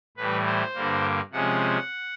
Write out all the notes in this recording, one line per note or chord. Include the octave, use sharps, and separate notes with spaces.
A2 E3 G3 B4
C5
G2 D3 G3 A#3
C3 F3 G#3 C#4 F#5